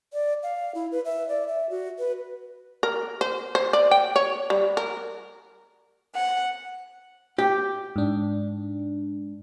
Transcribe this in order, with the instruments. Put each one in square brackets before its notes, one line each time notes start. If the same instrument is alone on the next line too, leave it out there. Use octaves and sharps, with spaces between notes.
[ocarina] D5
F5
E4
B4
E5
D5
E5
F#4
B4
[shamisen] A#4
C5
C5
D5
G5
C#5
G3
A#4
[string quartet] F#5
[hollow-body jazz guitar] G4
[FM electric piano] G#2 D4